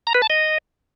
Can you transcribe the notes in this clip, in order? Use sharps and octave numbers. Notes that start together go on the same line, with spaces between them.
A#5
B4
A5
D#5